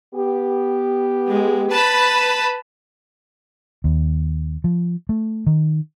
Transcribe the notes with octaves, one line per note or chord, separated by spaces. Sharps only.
B3 G4
G#3
B4 A5 B5
D#2
F3
A3
D#3